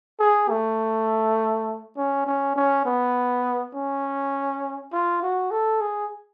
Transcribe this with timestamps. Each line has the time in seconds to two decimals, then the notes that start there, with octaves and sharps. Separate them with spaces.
0.20 G#4
0.49 A3
1.97 C#4
2.26 C#4
2.56 C#4
2.86 B3
3.74 C#4
4.92 F4
5.22 F#4
5.51 A4
5.81 G#4